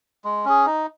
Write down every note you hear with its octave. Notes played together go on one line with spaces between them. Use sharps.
G#3
C#4 G#4
D#4